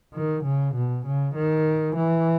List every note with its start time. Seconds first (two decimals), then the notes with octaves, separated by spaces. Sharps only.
0.14 D#3
0.44 C#3
0.75 B2
1.06 C#3
1.35 D#3
1.96 E3